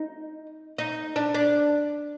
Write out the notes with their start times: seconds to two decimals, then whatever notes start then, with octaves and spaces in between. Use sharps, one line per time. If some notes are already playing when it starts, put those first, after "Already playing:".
Already playing: D#4
0.78 D#4
1.16 D4
1.35 D4